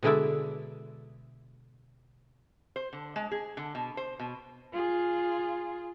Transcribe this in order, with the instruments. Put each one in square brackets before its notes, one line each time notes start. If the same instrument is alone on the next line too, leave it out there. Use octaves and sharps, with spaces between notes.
[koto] B2 D3 G#3 E4 D5 E5
[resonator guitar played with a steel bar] C5
D3
G#3
G#4
D3
B2
C5
B2
[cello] F4 G#4